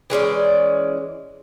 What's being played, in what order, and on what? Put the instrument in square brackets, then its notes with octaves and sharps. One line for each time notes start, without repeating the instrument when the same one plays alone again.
[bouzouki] E3 G#3 C#4 D5